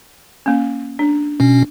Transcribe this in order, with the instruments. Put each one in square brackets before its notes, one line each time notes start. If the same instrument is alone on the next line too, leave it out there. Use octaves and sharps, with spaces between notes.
[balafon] A#3 C#4
D4
[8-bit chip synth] B2 C#4